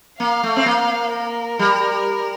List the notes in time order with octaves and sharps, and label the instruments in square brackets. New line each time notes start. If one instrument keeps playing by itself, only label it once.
[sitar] A#3 [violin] F5
[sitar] A3
C4
A#3
[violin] A#4
[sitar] G3